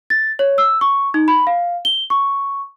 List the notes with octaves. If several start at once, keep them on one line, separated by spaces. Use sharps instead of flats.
A6
C#5
E6
C#6
D#4
B5
F5
G7
C#6